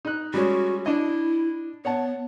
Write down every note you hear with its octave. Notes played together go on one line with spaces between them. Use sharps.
D#4 F#6
G3 G#3 C#4 F#4
D4 E4 D#5
B3 C#5 F#5 A5